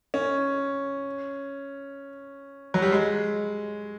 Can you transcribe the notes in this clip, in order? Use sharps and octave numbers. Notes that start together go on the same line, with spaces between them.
C#4
F#3
G3
G#3